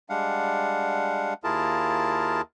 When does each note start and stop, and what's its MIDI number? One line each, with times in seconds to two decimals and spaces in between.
0.10 1.34 55
0.10 1.34 56
0.10 1.34 62
0.10 1.34 77
0.10 1.34 78
1.44 2.41 39
1.44 2.41 64
1.44 2.41 65
1.44 2.41 68
1.44 2.41 70
1.44 2.41 81